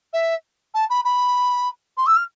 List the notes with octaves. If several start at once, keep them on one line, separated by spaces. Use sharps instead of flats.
E5
A5
B5
B5
C6
E6
F6